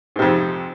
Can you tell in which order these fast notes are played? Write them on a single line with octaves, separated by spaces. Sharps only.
G#2 C3 F2